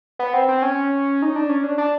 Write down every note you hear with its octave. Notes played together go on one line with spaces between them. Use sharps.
B3
C4
C4
C#4
D#4
D4
C#4
D4
D4